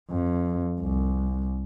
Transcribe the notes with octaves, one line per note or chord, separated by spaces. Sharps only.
F2
C2